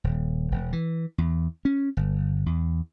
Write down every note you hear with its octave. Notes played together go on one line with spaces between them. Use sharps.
D#1
E1
E3
E2
C#4
G1
E2